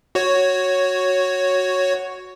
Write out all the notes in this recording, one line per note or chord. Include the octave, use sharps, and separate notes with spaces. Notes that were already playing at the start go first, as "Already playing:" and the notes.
F#4 C#5